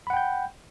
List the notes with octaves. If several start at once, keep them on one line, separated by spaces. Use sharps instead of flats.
F#5 G5 B5 G6